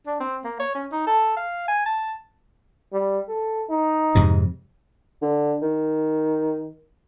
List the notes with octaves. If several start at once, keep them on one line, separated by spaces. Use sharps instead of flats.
D4
C4
A#3
C#5
C#4
D#4
A4
F5
G#5
A5
G3
A4
D#4
F2 G#2 C3
D3
D#3